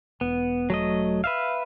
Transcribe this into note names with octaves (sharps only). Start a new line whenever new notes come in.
E1 B3
F#3 A3 D#5
B4 E5 F5